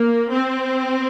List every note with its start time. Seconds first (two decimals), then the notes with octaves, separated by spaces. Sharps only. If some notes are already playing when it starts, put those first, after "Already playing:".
Already playing: A#3
0.32 C4